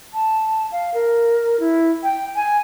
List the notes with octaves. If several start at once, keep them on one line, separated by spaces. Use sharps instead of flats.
A5
F5
A#4
E4
G5
G#5